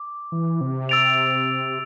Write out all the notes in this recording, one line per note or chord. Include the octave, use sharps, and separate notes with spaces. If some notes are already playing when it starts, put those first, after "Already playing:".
Already playing: D6
E3
C3
E6 A6 D7 F7